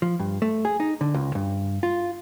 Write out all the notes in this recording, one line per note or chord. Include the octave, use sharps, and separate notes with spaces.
F3
G2
A3
G#4
D#4
D3
C#2
G2
F4